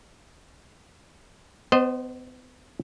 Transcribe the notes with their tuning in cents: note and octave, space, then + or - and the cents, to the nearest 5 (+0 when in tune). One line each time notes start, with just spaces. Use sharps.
B3 +40 C5 +0 D#5 -15